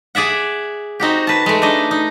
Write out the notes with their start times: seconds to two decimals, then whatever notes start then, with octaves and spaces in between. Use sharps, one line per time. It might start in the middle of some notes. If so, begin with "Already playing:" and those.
0.15 G#4 D5 E5 F#5
1.00 C4 D#4 F#4 G4
1.27 B4 A5
1.46 G#3 A3
1.62 D4 D#4 D#5
1.91 D#4